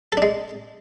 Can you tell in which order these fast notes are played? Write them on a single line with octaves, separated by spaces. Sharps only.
A4 D4 G#3